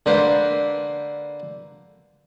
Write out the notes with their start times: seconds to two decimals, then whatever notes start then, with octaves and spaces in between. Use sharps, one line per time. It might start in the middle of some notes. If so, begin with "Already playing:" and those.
0.06 D3 A#3 B4 C5